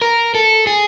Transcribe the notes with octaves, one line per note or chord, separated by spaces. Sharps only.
A#4
A4
G#4